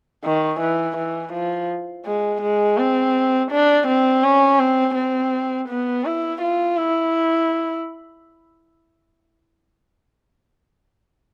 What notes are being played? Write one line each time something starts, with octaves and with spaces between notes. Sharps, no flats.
D#3
E3
E3
F3
G#3
G#3
C4
D4
C4
C#4
C4
C4
B3
E4
F4
E4